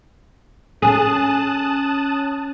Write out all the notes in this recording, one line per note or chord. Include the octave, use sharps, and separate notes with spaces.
C#4 G#4 A5 D#6 F#6